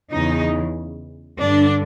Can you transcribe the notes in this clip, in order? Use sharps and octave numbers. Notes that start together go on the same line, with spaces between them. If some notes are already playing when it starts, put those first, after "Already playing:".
E2 C#3 E3 D#4
G2 D3 D4